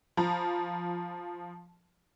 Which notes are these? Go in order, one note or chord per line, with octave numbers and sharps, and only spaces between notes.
F3 A#5 B5